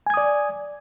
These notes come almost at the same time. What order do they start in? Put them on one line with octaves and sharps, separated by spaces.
G#5 G#6 D#6 D5